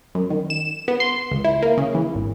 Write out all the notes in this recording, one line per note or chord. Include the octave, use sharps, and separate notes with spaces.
F#2
D#3
E7
B3
C6
C#2
E4
A#3
C#3
E3
G#1